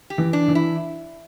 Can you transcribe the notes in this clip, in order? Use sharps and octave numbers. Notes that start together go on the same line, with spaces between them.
G4
E3
D4
E3
E4